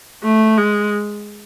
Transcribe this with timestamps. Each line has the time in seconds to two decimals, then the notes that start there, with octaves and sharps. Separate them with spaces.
0.23 A3
0.58 G#3